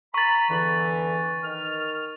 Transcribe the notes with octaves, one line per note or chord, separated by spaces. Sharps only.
A#5 B5 C#6 A6
E2 D3 E3
D#3 F6